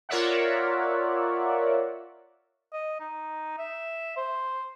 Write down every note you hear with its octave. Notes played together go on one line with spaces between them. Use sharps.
F4 A#4 C#5 D5 E5 F#5
D#5
D#4
E5
C5